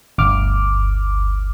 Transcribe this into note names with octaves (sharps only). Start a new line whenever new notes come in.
G1 D2 D6 F6